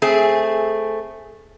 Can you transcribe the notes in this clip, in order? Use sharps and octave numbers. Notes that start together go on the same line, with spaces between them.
A3 C4 G#4